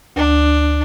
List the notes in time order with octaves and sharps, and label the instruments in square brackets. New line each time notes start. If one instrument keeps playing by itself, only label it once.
[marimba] D2 [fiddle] D4